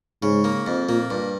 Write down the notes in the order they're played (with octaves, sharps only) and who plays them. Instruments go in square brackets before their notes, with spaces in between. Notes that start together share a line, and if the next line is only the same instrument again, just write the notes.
[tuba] G#2 [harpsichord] C#3
[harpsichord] A#3
F2
[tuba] A#2 [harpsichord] A#3
[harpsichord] G2